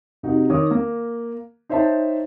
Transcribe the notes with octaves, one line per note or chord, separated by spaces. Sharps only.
C3 D#4 F#4
D#3 C#5 D6 D#6
A#3
D#4 C5 C#5 E5 G5 A5